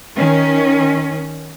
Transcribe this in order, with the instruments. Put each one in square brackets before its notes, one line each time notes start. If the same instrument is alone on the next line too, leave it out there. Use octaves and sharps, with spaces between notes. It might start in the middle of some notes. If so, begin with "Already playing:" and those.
[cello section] D#3 C#4